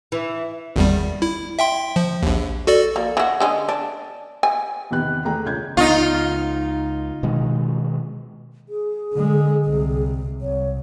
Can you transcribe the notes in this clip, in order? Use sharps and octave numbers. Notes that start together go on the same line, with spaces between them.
E3
G#1 E2 G3
E4
E5 G5 C6
F3
A#1 D#2
F#4 A4 D5
A#3
E3 F#4
D3 G#3 C#4
D4
G#5
E2 C3 D#3 B3 F#6
E2 A3 G#4 G5 A#5
C#2 C#4 G6 G#6
C#2 B3 D#4 F4
B2 D#3 G#3
G#4
D3 G#3
C2 C3
C2 C#5